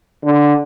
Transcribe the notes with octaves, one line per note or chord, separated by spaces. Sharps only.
D3